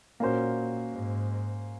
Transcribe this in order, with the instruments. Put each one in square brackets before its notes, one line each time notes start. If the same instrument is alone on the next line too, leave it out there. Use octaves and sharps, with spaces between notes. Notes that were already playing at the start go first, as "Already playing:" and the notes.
[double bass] A#2 [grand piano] A#3 C#4 F#4 C5
[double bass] G#2